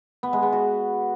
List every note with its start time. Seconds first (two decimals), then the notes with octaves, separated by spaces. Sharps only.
0.23 B3
0.33 G#3
0.43 B3
0.53 F#4